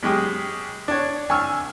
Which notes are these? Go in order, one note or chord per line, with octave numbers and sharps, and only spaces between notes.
F#2 G#3 G4 D#6
D4 C#5
C2 G#5 C#6 E6 F6